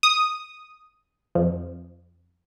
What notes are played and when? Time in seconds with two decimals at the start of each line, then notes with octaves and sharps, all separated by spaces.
0.03 D#6
1.35 F2